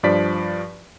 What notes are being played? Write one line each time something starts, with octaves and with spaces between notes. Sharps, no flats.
G2 F3 D5 B6